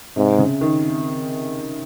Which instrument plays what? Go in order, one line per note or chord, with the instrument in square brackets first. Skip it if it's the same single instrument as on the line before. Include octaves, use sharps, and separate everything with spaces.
[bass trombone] G#2 [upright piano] C3
[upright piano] C#3
D#3